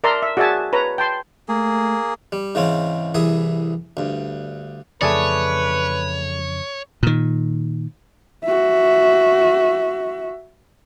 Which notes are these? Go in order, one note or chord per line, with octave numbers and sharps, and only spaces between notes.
A#4 D5 E5 A5 A#5 C6
E5
F#4 G#4 D5 E5 G#5 A5
B4 C#5 A#5
G5 A5 C6
A3 A#3 G#4
G3
G#2 C#3 E3 C4 C#4
C2 E3 G#4 E5 D#6
D2 G2
F2 C#3 E3 A3 G#4 B4 C#5 D5
A#2 D#3
F#4 E5